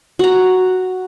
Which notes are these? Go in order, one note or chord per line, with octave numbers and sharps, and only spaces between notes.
F#4 A#5